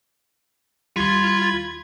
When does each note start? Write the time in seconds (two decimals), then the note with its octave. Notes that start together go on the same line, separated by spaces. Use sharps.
0.96 D#2 G3 F4 B5 C6 G#6